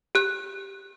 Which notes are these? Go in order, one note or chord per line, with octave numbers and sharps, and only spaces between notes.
G4 F#6